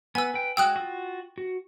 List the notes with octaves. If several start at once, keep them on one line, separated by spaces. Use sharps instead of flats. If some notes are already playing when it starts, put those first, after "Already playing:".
B3 B4 G#5 E6
B4 G5
G#3 F#4 G5 D#6 E6 F#6
F4 F#4
F#4